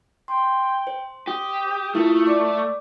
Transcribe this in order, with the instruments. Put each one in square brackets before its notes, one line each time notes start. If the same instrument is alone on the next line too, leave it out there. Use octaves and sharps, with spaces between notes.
[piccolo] G5 [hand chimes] C6
[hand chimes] C5
[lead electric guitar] G4 [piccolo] D#6
[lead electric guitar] A3 [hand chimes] E4 F4 A#4
[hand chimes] D5 D6